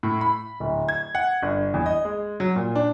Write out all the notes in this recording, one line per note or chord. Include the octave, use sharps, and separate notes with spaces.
A2
B5
D1
G#6
F#5
G1
E2
D#5
G#3
F#3
A#2
D4